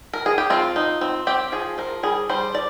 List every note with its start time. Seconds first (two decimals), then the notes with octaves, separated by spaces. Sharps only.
0.13 A#4
0.26 G#4
0.38 G4
0.50 C4 F4
0.76 D#4
1.01 C4
1.27 C4 G4
1.52 F3 G#4
1.78 F3 A#4
2.03 G3 G#4
2.29 G3 C5
2.55 D5